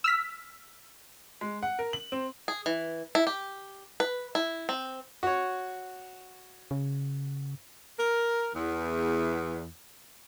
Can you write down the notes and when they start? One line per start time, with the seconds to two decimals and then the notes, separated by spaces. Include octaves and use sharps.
0.04 E6 F6 B6
1.41 G#3
1.63 F#5
1.79 A#4
1.93 F#7
2.12 C4
2.48 G#4
2.66 E3
3.15 E4
3.27 G4
4.00 B4
4.35 E4
4.69 C4
5.23 F#4 C#5
6.71 C#3
7.98 A#4
8.54 E2